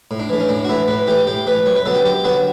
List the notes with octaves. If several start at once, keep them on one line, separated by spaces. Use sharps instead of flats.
A2
D4
E3 A3
C#4
A2 D4
F#4
E3 A3 E4
A2 B4
E3 A3 G4
A2 G4
E3 A3 B4
F#2 C#5
B4
D3 F#3 B3 A4
G4
F#2 G4
D3 F#3 B3 F#4